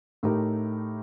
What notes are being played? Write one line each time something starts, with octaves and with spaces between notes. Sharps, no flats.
A2 A3 D#4 G4 A#4